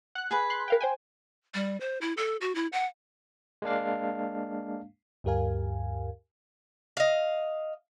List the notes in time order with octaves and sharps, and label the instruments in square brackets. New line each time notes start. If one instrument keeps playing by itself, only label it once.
[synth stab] F#5 F#6
[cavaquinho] G#4 B4 B5
[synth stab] C6 F#6
A#4 F5 G5
C5 G5 G#5
[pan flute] G3
C5
E4
A4
F#4
E4
F#5
[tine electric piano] G#3 A#3 D4 F5
[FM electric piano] D2 G2 G4 A#4 F5 G#5
[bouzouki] D#5 F5